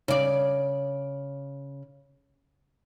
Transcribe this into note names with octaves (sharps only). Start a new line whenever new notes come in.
C#3 D5